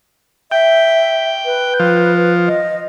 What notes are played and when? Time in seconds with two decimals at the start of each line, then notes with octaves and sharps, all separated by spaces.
0.52 E5 G5
1.45 B4
1.79 F3
2.47 D#5